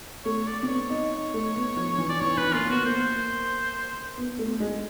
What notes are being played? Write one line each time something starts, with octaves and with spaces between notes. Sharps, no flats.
A3 C#5
D5
C4 D5
B3 C#5
D#4
D#4
A3
B3
F3
E3
D5
E3 C#5
E3 B4
A#3 F4
B3 F#4
A#3 C5
B3
A3
G#3